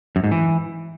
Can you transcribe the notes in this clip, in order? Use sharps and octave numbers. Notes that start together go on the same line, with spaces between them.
F#2
G#2
E3